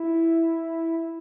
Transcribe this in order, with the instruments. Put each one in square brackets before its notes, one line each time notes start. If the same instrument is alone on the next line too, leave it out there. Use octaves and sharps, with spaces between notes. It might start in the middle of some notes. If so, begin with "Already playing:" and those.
Already playing: [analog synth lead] E4